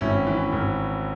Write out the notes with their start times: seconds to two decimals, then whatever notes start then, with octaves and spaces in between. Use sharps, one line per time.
0.01 G#1 C#4 E4
0.27 E3
0.52 G#1